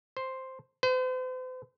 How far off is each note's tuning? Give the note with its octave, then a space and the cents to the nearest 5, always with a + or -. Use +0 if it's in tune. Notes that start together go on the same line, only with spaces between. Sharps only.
C5 +0
C5 -45